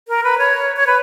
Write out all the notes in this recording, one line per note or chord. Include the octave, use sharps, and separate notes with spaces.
A#4
B4
C#5
C#5
B4